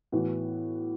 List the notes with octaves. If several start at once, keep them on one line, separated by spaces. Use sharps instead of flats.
A2 E3 B3 F#4